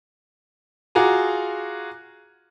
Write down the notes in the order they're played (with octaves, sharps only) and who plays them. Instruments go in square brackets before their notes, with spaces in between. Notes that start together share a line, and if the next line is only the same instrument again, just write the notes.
[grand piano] F4 F#4 G#4 A#5 D6